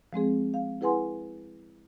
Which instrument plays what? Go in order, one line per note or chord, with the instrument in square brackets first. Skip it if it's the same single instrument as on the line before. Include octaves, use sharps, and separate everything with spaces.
[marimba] F3 G#3 C4 G#4
F5
E4 G#4 B4 F#5 G#5 C6